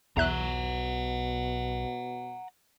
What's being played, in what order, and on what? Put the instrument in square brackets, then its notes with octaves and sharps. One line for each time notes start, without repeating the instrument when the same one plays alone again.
[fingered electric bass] B1 [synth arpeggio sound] E2 E5 F#6 [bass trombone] B2 [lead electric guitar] F#5 A#5